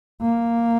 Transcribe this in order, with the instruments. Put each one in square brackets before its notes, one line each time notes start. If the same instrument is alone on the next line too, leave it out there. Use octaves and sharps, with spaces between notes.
[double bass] A#3